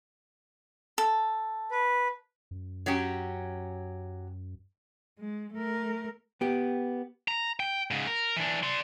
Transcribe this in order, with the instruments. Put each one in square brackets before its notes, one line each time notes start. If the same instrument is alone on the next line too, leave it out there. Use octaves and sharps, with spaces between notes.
[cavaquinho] A4
[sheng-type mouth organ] B4
[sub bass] F#2
[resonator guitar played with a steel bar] F#3 C#4 G4
[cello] G#3
A3 A#4
[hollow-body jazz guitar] B3 G4
[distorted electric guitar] A#5
G5
G#2 C#3
A#4
E3 D4
D5 C6